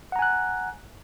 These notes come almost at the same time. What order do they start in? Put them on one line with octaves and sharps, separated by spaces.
F#5 A#5 G#5 F#6